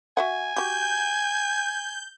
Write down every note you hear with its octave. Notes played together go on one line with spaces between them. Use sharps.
F#4 E5 F#5 G#5
F#4 G4 G6